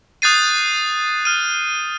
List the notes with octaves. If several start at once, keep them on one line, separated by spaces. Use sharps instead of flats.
D#6 F#6 G6 A6 C7 D#7
F6 D#7